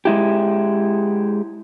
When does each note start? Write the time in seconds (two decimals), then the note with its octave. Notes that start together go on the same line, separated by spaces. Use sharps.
0.05 G#3 E4 G4